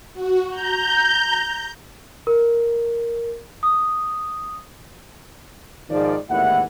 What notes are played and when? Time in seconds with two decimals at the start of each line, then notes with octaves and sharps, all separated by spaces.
0.14 F#4
0.50 A#5 G6
2.27 A#4
3.63 D#6
5.90 G#2 D#3 F3 D5
6.30 G#1 D#2 A2 E3 E4 F#5